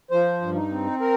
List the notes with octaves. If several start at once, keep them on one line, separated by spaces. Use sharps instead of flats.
F3 C5
G2
D#4
C4
A#4